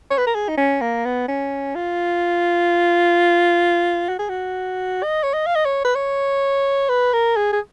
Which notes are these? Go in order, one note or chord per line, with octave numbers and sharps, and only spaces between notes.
C#5
B4
A#4
G#4
D#4
C#4
A#3
B3
C#4
F4
F#4
G#4
F#4
D#5
C#5
D#5
F5
D#5
C#5
B4
C#5
B4
A#4
G#4
G#4